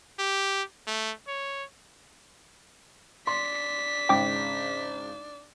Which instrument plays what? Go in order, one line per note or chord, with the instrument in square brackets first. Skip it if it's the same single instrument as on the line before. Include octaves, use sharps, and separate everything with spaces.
[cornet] G4
A3
C#5
[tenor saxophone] D4 [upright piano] C6 [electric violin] B6
[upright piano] G#1 C#3 [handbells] G5 D6